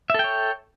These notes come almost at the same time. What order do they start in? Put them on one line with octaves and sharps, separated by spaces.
E5 A4 G5 C#5